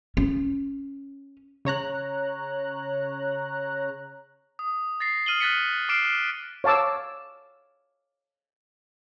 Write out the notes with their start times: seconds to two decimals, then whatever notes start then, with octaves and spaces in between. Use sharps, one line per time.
0.17 C#4
1.65 C#3 C#5 A#5 F#6
4.59 D#6
5.00 A6 A#6 C7
5.26 D#6 F6 D#7 F#7 G7
5.40 F#6 A6 B6 C#7
5.89 D6 F6 C7 D7 E7
6.64 C#5 F5 A5 D6 E6